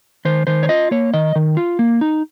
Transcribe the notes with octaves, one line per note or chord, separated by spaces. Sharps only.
D#3 C5
D#3 C5
C#5
F4 D#5
A#3 C#5
D#3 D#5
D#3
F4
A#3
D#4